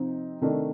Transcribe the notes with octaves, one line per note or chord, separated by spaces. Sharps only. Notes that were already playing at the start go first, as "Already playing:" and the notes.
Already playing: C3 F3 C4 D#4
C3 D#3 A3 D4